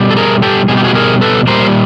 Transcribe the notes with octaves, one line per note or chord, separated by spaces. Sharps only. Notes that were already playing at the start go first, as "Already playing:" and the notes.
Already playing: B2 G3
A4
G#4 A#4
G4 A4
B2 G3 G#4
G4
F#4 G#4
G#4 A#4
A4 B4
A#2 G3 A#4 C5